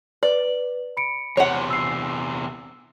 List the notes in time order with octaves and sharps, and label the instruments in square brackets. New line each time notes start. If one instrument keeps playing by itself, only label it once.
[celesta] B4 [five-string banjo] D5
[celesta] B5 C#7 D7
[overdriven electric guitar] E2 C3 [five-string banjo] C#5 F#5
[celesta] E6 C7